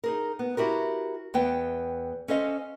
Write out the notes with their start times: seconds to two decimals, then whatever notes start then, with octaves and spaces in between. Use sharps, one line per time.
0.04 D#4 G#4 A#4
0.39 B3
0.57 E4 F#4 G4 A#4
1.34 E2 B3 G5
2.28 C#4 A4 C5 D#5 F5